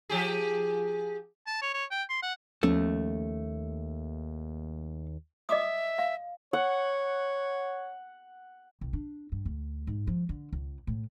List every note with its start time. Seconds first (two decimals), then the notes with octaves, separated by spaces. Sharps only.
0.09 F3 G4 G#4
1.47 A5
1.62 C#5
1.74 C#5
1.91 G5
2.10 C6
2.22 F#5
2.63 D#2 F3 A3 B3 C#4
5.49 D#5 E5 D6 D#6
5.98 F5
6.53 C#5 F#5
8.81 C2
8.93 D4
9.32 G2
9.45 D2
9.87 G#2
10.07 F3
10.29 D3
10.53 C#2
10.87 A2